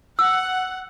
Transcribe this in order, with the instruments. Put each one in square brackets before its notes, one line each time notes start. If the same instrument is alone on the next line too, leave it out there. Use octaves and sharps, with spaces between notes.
[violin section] F#5 [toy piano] E6